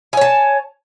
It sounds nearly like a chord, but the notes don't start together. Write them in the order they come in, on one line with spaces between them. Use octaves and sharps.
G#5 C#5 A5